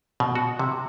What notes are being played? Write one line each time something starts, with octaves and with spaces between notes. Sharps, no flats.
B2
F#4
C3